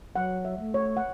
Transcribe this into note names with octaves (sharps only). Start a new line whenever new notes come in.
F#3 F#5
E5
A3
C#5
F#5